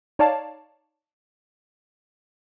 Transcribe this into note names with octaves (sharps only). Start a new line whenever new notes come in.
D#4 C#5 D5 F5 A5